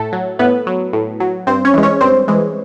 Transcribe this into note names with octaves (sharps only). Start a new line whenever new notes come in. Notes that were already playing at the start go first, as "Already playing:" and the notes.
Already playing: A2 A3 A4
F#3
A2 B3 B4
F#3
A2
F#3
G2 C4 C5
C#4 C#5
E3 G#3
C#4 C#5
G2 C4 C5
E3 G#3